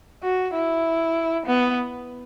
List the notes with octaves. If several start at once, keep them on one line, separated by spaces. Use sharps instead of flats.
F#4
E4
B3